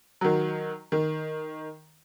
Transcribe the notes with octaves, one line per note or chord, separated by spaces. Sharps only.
D#3 F#3
D#3